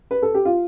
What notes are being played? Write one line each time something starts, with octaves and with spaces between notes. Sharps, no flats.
B4
A4
G4
F4